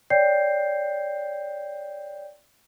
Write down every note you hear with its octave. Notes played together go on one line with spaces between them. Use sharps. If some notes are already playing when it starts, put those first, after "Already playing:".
C#5 D5 G5 G6 C7